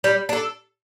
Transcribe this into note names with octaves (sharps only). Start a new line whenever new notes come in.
G3
D4 A4